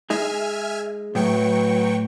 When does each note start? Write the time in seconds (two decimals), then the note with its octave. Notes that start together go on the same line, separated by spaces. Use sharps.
0.10 G#3 D#4 G#4 E5 G#5 F6
1.15 A2 F#3 B4 G5 C#6